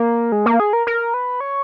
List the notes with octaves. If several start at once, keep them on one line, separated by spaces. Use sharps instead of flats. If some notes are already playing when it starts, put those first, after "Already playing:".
Already playing: A#3
G#3
A#3
G#4
A#4
A#4
B4
C#5